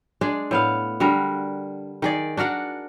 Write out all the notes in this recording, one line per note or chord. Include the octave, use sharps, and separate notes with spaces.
G#3 D4 G#4
A2 B3 F5
D3 G3 F#4 A#4
D#3 G#4 D5
D4 F#4 A#4 F#5